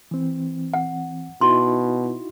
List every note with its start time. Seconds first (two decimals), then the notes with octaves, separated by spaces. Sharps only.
0.11 E3 C4
0.74 F#5
1.41 B2 D#4 E4 F#4 C6